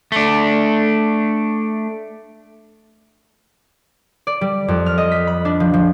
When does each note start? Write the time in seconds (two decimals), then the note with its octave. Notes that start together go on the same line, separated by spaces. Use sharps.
0.12 A3 D4
4.27 D5
4.41 G3
4.68 F2
4.86 F6
4.98 D#5
5.11 B6
5.27 B5
5.45 D4
5.60 F3
5.73 F3